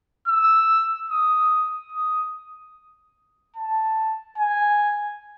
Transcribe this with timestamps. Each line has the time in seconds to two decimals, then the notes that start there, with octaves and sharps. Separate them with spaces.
0.28 E6
1.10 D#6
1.92 D#6
3.56 A5
4.38 G#5